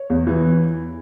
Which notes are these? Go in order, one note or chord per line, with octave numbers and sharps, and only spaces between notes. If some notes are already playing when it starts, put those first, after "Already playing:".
Already playing: C#5
E2
E3